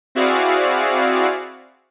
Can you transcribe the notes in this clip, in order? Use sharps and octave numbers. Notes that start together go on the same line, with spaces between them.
C4 E4 F#4 G#4 D5 F5